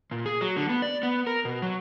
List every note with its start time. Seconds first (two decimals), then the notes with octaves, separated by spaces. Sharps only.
0.11 A#2
0.26 G#4
0.41 F#3
0.57 D3
0.69 B3
0.82 D5
1.03 B3
1.27 A#4
1.45 B2
1.62 F#3